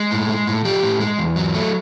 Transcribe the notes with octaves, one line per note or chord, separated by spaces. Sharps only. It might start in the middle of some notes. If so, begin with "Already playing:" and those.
Already playing: G#3
A2
G#3
A2
F3 G4
A2
G#3
E2
F#3
A3